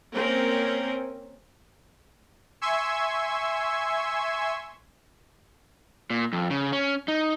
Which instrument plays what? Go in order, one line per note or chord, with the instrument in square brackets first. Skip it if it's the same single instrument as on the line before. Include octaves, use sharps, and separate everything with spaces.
[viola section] A#3 C4 C#4 A#4
[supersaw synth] E5 G#5 C6 C#6 E6 G#6
[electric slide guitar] A#2
F2
C#3
C#4
D#4